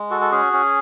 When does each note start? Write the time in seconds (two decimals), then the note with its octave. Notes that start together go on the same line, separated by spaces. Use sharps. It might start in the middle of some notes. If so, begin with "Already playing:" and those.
Already playing: G#3
0.11 F#4 A4
0.21 A4
0.32 C#4 G#4
0.53 C#4